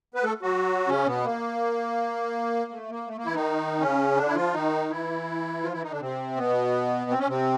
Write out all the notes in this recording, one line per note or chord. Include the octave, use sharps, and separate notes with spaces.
B3 B4
A3 A4
F#3 F#4
C#3 C#4
B2 B3
A#3
A3
A#3
A3
A#3
E3 E4
D#3 D#4
C#3 C#4
D3 D4
E4
F3 F4
D#3 D#4
E3 E4
F3 F4
E3 E4
D#3 D#4
D3 D4
C3 C4
B2 B3
C4
C#4
C3 C4